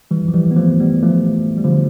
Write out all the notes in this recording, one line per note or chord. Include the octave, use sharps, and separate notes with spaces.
E3 G3
F3
E3 G3
B3
F3 A3
G3 B3
F3 A3
G3
D3 F3